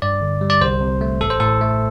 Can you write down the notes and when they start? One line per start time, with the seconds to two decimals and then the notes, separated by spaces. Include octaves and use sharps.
0.02 G2 D5
0.21 D3
0.41 G3
0.50 D5
0.61 C2 C5
0.81 C3
1.01 A3
1.21 A1 A4
1.30 C5
1.40 A2 A4
1.61 A3